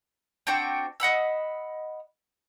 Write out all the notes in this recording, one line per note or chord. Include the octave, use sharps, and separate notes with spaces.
C4 D4 F#4 G5
D#5 F#5 B5 E6